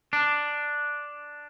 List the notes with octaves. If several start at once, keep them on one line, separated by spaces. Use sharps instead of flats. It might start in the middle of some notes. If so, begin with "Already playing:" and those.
D4